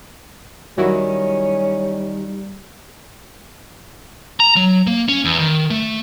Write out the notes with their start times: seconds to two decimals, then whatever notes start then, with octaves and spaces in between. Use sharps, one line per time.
0.78 D#3 F#3 G3 C#4 E4 F#4
4.40 A#5
4.56 F#3
4.87 A#3
5.09 C#4
5.25 E2
5.39 D#3
5.70 A3